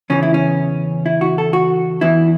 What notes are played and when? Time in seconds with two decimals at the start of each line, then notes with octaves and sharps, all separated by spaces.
0.10 E2 C#3 E3 C#4
0.23 E4
0.34 C#4
1.06 E4
1.21 F#4
1.38 A4
1.53 F#4
2.01 E2 E3 E4